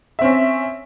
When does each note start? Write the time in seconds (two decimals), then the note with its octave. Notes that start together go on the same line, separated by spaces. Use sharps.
0.19 E5
0.21 C4
0.24 C#4